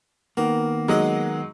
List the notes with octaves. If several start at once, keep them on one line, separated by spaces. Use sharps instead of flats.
D#3 A#3 B3 F#4 A#4
F#3 G#3 D#4 D#5 F#5